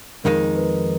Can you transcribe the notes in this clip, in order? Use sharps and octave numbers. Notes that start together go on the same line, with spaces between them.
F2 D#3 G#3 D#4 A#4
B4